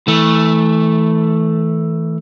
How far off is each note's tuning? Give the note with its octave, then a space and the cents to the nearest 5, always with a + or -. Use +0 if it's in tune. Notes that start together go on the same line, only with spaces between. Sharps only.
E3 -20 A3 +0